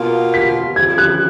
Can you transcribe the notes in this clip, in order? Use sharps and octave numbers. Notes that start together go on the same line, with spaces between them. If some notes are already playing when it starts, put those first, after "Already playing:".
Already playing: B2 A#3 F4
B6
F2 C#3 F3 G#6
F#6